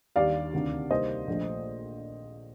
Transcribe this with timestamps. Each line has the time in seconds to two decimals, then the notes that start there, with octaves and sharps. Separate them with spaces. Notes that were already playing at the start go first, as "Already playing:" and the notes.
0.16 D#2 D#3 G3 D4 D5 F5
0.53 D2 C3 D#3
0.91 C2 C3 G3 A#3 D#4 C5 D#5
1.27 A#1 A#2 F3 A3